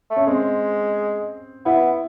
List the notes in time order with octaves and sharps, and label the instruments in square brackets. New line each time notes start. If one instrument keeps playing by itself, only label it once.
[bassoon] A3
[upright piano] C#4
[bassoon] G#3 [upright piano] C4
[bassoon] B3 [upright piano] E4